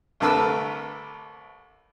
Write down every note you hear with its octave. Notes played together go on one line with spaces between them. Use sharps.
C2 D3 A3 A#4 B4 E6